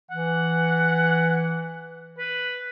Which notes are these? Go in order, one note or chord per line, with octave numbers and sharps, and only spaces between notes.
E3 F#5
B4